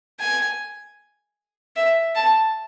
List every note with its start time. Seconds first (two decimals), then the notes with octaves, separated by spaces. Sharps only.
0.20 G#5
1.76 E5
2.16 A5